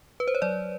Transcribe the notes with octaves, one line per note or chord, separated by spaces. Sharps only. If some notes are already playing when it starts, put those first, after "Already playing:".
B4
C5
C#5
F#3 D5